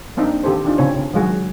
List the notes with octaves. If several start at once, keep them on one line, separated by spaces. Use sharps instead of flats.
A#3 C4 D4 D#4
D#3 C4 G4 A4 C5
D#3 D4 D#4 F4
C#3 C4 C#5
C#3 C4
D#3 F#3 G#3 F#4 G#4